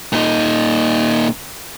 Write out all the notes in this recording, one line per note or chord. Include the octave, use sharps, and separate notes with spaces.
A#2 D#4